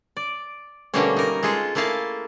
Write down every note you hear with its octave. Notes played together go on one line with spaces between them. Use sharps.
D5
B2 D3 G3 A3 A#3 C#4
D#4 A#4
G#3 F4 G#4 A4
A3 A#3 E4 G#4 F5 A5